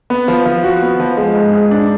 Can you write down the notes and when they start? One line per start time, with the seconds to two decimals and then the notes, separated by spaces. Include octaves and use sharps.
0.10 B3
0.28 F3
0.46 F3
0.64 F#4
0.82 B3
1.00 F3
1.17 G#3
1.36 G#2
1.53 G#2
1.71 D4